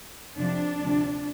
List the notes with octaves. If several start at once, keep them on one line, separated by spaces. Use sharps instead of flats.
F2 C3 F3 D4
D2 C3 F3